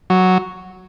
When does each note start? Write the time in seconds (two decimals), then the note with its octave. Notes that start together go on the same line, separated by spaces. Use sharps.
0.10 F#3